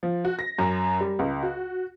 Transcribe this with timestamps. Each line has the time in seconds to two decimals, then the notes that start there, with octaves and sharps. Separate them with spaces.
0.03 F3
0.25 F#4
0.39 A#6
0.58 F#2
1.01 G3
1.19 C#2
1.43 F#4